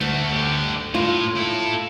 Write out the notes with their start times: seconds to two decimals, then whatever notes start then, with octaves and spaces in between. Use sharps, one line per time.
0.01 D2 A3 F#4
0.33 D3 G4
0.94 A2 F4
1.37 E4 A4